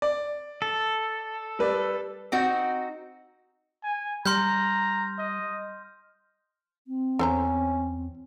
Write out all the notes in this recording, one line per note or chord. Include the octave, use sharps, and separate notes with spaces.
D5
A4
G3 B4 D5
C4 D#4 F#4
G#5
G3 A#5 C6 F6 G6
D#5
C4
E2 C#4 A4 C5 A#5